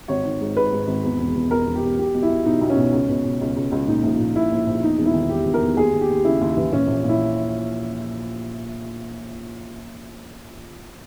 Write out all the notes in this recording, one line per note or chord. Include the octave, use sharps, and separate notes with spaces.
G#1 C#5
D#3
G#2
G#2 B4
G#2
G#1
E2
E1
E2
E2 A#4
E1
G4
E1
B1 G4
B1
E4
B1
B2 D#4
B1
C#4
B2
C#2
B2
B2
C#2
C#2
C#2
A#2 D#4
A#1
A#2
A#1 E4
A#1
A#1
E2 D#4
E1
E4
D#3
E1 G4
E2
A#4
E2
D#2 G#4
D#2
G4
D#2
C#3 E4
D#2
E3
A#2 C#4
A#1
A#2 E4